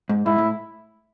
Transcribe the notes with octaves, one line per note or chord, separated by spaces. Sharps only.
G#2
G#2 E4
A2